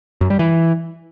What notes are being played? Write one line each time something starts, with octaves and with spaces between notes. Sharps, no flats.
F#2
G3
E3